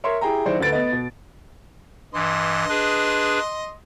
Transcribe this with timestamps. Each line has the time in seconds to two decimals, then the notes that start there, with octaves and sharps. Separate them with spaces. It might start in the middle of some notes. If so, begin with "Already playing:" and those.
0.04 A#4 C#5 E5 C6
0.21 E4 G4 G#4 G5 A#5
0.46 D#3 F#3 E4 F#4 C5 D5
0.60 D2 A3 B4 A6 D7
0.72 B3 D#5
0.92 B2
2.14 G2 E3 D#5 C6
2.69 D4 G#4 B4